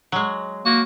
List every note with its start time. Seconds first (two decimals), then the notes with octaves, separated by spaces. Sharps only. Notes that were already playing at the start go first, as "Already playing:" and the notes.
0.12 F#3 G#3
0.65 A#3 F#4